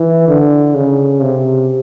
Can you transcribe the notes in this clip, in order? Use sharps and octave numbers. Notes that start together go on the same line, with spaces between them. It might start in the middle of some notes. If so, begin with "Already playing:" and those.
Already playing: E3
D3
C#3
C3